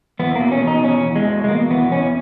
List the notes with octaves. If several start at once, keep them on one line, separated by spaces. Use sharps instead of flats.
E2 B3
A#3
B2
C#4
B2
D#4
E2 C#4
E2
G#3
B2
G#3
B2 A#3
E2 B3
E2 C#4